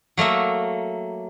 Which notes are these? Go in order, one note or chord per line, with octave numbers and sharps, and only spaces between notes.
F#3 A3 A#3 E5